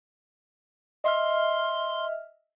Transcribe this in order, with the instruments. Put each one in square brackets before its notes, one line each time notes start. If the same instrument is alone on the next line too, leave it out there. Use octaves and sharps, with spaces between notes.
[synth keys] D#5 E5 F6 [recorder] C6